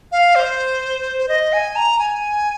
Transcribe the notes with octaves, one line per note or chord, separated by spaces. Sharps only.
F5
C5
C5
D#5
G#5
A#5
G#5